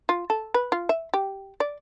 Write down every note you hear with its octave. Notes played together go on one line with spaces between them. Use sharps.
F4
A4
B4
F4
E5
G4
D5